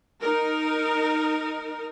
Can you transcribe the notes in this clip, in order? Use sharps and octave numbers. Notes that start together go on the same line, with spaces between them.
D#4 A#4